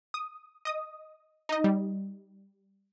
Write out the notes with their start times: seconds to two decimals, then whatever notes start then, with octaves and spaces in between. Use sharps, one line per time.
0.14 D#6
0.65 D#5 D#6
1.49 D#4 D#5
1.64 G3